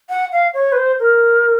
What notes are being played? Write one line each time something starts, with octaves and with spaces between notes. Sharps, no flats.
F#5
F5
C#5
B4
C5
A#4